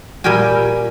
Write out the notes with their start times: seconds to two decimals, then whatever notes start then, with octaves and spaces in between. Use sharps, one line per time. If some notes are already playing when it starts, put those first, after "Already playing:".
0.24 A#2 G3 A#4 G5 G#5